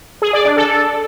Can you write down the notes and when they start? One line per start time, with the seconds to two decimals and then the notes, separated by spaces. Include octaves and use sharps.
0.22 G#4
0.33 D5
0.45 D4
0.56 A4